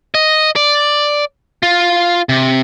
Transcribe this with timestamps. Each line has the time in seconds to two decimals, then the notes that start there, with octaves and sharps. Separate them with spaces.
0.15 D#5
0.56 D5
1.63 F4
2.29 C3